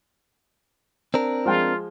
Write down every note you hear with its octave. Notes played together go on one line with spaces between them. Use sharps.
C4 D4 A#4
F3 G#3 F4 G5